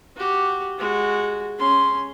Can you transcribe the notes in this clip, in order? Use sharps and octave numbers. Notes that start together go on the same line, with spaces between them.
F#4 G4
G#3 F#4
C#4 C6